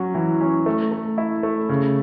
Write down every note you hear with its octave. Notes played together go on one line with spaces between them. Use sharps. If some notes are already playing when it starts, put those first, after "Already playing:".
Already playing: F#3 C#4 F#4
E3
C#4
A3
A3
E4
A3
C#3